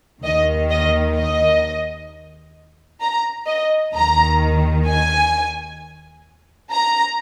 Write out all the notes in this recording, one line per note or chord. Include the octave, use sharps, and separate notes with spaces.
D#2 D#3 D#5
D#5
D#5
A#5
D#5
D#2 D#3 A#5
G#5
A#5